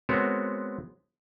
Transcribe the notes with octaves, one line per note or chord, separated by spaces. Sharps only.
G#3 B3 C4 F#4 A#4 C#5